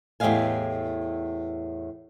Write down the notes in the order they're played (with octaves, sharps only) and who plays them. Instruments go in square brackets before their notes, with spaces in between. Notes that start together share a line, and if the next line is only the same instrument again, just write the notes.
[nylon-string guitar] E2 A2 G4 D#5 F5 G#5